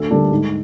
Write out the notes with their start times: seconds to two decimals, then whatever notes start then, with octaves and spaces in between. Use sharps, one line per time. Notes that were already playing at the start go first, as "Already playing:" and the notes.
Already playing: D2 E6
0.11 D3 G3 A#3 D4
0.31 G#2